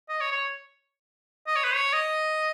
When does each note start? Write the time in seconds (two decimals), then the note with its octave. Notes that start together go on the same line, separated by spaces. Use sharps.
0.09 D#5
0.21 C#5
0.32 C#5
1.47 D#5
1.56 C#5
1.64 B4
1.74 C#5
1.93 D#5